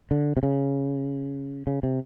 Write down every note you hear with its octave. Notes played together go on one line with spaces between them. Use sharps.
D3
C3
C#3
C#3
C3